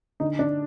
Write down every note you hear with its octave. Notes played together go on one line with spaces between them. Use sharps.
D3 D#4
D4